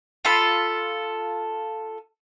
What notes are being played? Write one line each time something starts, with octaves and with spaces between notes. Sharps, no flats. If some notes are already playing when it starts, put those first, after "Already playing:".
F4 A4 B5